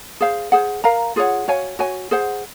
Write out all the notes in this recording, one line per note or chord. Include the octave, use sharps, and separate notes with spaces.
G#4 C5 F5
G#4 C5 F#5
A#4 F5 A#5
F4 G#4 C#5 F#5
F#4 C#5 F5 G#5
F#4 C#5 G#5
G#4 C5 F#5